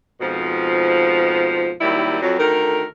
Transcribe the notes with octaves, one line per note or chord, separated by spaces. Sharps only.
F2 G#2 B2 F3
D#2 D#3 F#3 G3 E4
F2 F#3
D2 D#3 A4 A#4